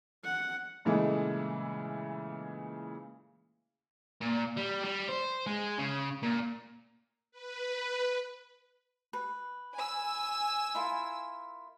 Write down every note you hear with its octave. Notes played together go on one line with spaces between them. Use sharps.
F#5
A#2 C#3 E3 G#3 A3
A#2
G3
G3
C5
G#3
C#3
A#2
B4
B4
G#5 E6
E4 F4 A#4